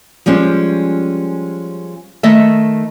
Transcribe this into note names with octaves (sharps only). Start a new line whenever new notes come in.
F3 G3 G#3 C#4
D#3 A3 D#5 E5